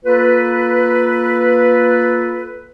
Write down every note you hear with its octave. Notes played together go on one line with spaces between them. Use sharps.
A#3 F4 A4 B4